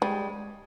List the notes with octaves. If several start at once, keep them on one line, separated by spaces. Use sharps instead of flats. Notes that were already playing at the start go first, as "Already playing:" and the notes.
G3 G#3